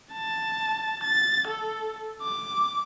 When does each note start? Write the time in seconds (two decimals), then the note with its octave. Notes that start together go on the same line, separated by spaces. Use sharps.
0.13 A5
1.04 A6
1.48 A4
2.22 D6